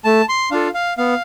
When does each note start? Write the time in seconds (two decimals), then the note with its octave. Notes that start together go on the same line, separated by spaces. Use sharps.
0.04 A3 A5
0.29 C6
0.51 D4 F4 A4 F5
0.74 F5
0.98 B3 F5